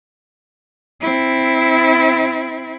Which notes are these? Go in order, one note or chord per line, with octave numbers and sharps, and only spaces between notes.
C4 E4